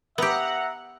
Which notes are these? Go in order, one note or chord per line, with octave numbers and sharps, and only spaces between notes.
B3 G4 E5 F#5 A#5